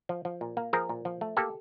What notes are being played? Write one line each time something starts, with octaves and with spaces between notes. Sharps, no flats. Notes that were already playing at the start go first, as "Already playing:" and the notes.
F3
F3
A#2
A#3
F3 G#4 A#4
A#2
F3
A3
A#3 G4 A4